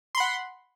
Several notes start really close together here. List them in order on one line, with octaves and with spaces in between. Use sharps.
C6 B5 F#5